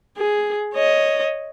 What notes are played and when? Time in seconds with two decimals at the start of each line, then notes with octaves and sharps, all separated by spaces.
0.17 G#4
0.74 C#5 D#5